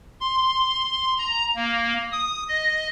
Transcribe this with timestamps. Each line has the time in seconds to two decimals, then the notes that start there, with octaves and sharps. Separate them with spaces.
0.20 C6
1.18 A#5
1.55 A#3
2.12 D#6
2.49 D#5